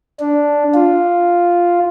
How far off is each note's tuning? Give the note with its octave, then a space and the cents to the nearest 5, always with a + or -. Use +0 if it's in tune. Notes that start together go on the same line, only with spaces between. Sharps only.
D4 -5
F4 +0